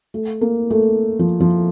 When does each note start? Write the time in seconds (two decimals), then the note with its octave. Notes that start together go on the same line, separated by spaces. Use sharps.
0.14 A3
0.41 A#3
0.70 A3
1.19 F3
1.40 F3